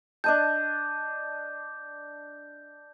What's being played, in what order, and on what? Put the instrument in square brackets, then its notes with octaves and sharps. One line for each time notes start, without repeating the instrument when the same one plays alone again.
[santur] D4 D#5 A5 [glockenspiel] G6